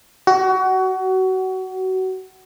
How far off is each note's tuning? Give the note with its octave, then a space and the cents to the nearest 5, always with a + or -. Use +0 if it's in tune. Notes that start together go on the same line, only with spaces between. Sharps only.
F#4 +25